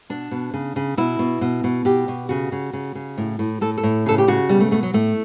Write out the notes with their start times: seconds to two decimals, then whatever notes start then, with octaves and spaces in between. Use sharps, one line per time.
0.10 B2 D4
0.31 B2
0.54 C#3
0.76 C#3
0.97 B2 E4
1.19 B2
1.41 B2
1.64 B2
1.85 B2 G4
2.08 B2
2.29 C#3 F#4
2.52 C#3
2.73 C#3
2.95 C#3
3.18 A2
3.39 A2
3.61 A2 A4
3.77 A4
3.83 A2
4.06 C#3 A4
4.18 G4
4.28 C#3 F#4
4.49 B2 G3
4.60 A3
4.71 B2 A3
4.83 F#3
4.93 A2 A3